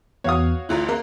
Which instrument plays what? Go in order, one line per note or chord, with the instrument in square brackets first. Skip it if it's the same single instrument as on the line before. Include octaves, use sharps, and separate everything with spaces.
[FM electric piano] E2 B3 [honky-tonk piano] F#4 [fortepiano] C#5 F5 D#6
[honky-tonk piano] A1 D2 F#6 [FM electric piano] E4 F4 A#5
[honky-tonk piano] A#3 A#4 [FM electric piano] E5